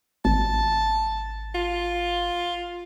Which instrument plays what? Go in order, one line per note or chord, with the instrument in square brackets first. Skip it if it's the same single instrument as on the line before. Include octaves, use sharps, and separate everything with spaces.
[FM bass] G#1 [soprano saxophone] A5
[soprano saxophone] F4